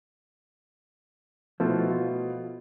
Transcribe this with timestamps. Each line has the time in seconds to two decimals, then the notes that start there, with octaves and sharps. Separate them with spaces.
1.60 B2 F3 A3 E4
1.90 F4